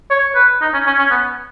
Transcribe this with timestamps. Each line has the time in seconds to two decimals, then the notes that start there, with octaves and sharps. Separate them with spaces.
0.11 C#5
0.36 B4
0.61 D#4
0.74 C#4
0.87 C#4
0.99 C#4
1.10 B3